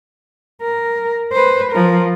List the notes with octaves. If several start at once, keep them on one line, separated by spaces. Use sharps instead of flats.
A#4
B4 C5
F3 A#4